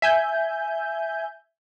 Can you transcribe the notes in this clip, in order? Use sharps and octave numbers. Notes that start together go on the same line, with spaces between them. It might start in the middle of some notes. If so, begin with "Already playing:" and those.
E5 G#5 G6